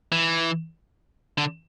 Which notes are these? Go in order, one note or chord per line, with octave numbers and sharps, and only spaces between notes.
E3
D3